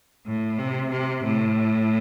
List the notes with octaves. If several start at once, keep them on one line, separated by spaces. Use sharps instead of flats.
A2
C3
C3
A2